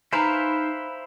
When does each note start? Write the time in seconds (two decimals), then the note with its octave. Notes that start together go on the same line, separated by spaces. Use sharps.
0.13 D#4 E4 B4 C5 F5 G#5 A#5